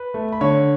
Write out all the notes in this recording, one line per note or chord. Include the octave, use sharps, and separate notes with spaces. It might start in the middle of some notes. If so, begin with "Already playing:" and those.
Already playing: B4
A3
B5
D3 C#5 C#6